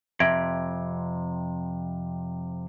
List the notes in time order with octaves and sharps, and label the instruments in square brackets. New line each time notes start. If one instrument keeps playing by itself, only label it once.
[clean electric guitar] F2 C3 [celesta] E5 G#6 D7